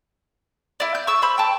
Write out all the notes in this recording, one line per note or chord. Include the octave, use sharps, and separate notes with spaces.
E4 D5
G6
C#6 E6
C5 B5
G5 A5